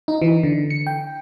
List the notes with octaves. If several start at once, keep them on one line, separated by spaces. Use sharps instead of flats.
D#4
E3
D3
C#7
G5